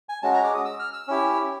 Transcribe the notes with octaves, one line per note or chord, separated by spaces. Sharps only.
G#5
G#3 C#4 F#4 A5
A#5
D6
D#6
E6
F6
E6
C#4 E4 G4